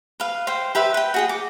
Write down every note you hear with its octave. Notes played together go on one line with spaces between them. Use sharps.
B4 F5
C5 G5
G4 B4 E5 B5
B4 G5
F#4 G#4 G5
D6